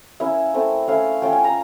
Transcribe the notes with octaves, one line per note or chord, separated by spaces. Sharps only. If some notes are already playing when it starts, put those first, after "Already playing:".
A#3 C#4 E4 E5
A3 C4 E4
A3 C#4 E4 F5
A3 C#4 F4 G5
G#5
A#5